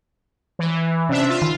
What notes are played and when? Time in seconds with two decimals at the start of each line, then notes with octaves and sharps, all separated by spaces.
0.59 E3
1.09 C3 C#4 D4 E5
1.29 F4
1.42 D#3